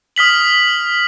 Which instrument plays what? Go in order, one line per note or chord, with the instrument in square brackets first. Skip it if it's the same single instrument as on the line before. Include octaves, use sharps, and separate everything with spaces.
[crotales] D#6 F6 B6 F#7